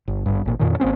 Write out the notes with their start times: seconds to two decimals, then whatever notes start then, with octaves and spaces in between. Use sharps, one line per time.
0.08 G1
0.26 G#1 G2
0.45 G#1 A#2
0.60 F2 A#2 D#3
0.80 G#1 A#3 C4 C#4